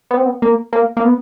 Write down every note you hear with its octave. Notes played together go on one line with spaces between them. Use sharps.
B3
C4
B3
A#3
A#3
A#3
B3